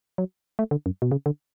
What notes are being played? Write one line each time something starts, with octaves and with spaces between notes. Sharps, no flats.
F#3
A3
D3
F#2
B2
C#3
D3